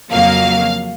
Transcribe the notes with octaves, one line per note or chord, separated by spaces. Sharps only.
F2 C#3 F#3 A#3 F5